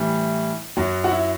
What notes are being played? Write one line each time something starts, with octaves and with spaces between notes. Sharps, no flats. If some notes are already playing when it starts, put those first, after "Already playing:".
Already playing: A2 E3 G3
F#2 F#3
F#4
E4